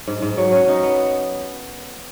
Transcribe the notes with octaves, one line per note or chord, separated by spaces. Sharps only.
G#2
G#2
F#3
C#4
D#4
B3